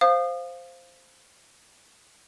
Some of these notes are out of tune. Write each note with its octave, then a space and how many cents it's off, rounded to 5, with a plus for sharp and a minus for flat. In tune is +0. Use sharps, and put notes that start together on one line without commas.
C5 +0 F5 +0 D#6 -35